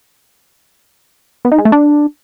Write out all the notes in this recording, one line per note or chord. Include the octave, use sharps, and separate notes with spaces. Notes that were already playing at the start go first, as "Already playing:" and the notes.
B3
D#4
G#3
A3
D4